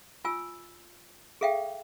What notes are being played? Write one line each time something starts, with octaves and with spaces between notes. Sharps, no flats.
F4 G#5 E6
G#4 A4 E5 F5 G5